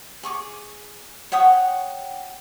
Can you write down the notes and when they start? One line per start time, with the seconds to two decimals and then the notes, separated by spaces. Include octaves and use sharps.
0.23 G#4 C#6 D6
1.32 C#5 F#5 G5 D#6